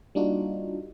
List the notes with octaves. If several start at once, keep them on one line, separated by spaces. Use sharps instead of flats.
G3 A#3 D4 D#4 F4 F#4